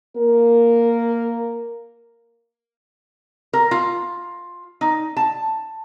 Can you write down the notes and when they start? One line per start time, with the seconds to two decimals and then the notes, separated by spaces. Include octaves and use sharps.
0.17 A#3 A#4
3.53 A#4
3.71 F4
4.81 D#4
5.17 A5